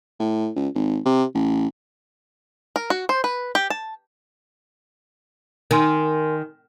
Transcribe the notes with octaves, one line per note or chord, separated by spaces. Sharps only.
A2
C#2
G#1
C3
A1
A#4
F#4
C5
B4
G4
A5
D#3 A#4 G#5 C6